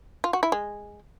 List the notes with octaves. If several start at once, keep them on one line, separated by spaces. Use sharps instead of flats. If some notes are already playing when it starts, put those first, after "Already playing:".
F4
F#4
E4
G#3